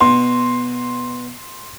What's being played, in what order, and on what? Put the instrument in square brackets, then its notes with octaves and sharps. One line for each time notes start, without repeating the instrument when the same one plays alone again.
[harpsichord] B2 [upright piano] C6